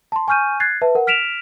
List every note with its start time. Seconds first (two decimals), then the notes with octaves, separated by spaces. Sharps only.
0.12 A5 C6
0.28 G#5 C#6 F6 G6 D#7
0.60 F#6 G#6 A6 C7
0.81 B4 E5 A5
0.95 A#4 F#5
1.07 F6 B6 D7 E7 F7